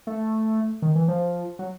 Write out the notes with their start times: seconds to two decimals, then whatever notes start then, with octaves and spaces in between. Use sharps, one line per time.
0.07 A3
0.82 D#3
0.95 E3
1.08 F3
1.59 F#3